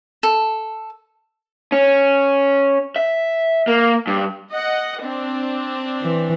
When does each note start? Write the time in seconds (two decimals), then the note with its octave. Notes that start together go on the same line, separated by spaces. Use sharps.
0.23 A4
1.72 C#4
2.96 E5
3.67 A#3
4.07 G2
4.52 D#5 F#5
5.03 C4 D4
6.02 E3